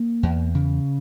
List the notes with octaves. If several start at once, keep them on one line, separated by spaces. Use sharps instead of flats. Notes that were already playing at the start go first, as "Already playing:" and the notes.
Already playing: A#3
E2
C#3